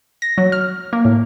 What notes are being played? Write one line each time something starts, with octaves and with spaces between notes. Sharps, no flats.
A#6
F#3
F6
A#3
A2